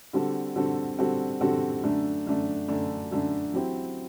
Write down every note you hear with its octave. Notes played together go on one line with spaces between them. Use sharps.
D3 G3 C4 F#4 A4
D3 G3 C4 F#4 A4
D3 G3 C4 F#4 A4
D3 G3 C4 F#4 A4
F#2 D3 A3 D4
F#2 D3 A3 D4
F#2 D3 A3 D4
F#2 D3 A3 D4
F#3 C4 E4 G4